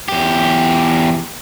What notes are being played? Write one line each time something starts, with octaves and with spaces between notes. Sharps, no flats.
E2 G4